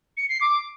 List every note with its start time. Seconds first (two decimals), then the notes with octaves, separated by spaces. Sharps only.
0.17 C#7
0.29 C7
0.40 D6